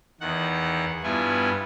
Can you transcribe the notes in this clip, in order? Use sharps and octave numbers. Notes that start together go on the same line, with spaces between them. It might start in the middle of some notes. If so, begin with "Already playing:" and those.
E2 D#3 F#5
G2 B3 E4 F4 G#5